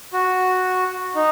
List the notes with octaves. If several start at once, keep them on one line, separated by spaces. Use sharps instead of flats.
F#4
D#4